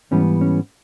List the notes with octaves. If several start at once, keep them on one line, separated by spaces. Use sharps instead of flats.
G#2 E3 G3 B3 C#4
C#4